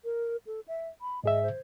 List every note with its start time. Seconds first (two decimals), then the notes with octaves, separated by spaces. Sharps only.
0.04 A#4
0.47 A4
0.68 E5
1.01 B5
1.24 G#2 G#4 D#5 E5
1.43 C5